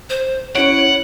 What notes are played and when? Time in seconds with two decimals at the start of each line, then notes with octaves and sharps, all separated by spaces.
0.10 C5
0.55 C#4 E4 C#5 F#5 D7